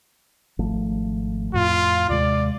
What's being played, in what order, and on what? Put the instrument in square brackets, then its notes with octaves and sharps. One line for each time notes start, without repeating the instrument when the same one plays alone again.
[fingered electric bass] G#1 F3 A3
[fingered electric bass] F2 A2 [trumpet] F4
[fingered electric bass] D#2 C3 G#3 [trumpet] D5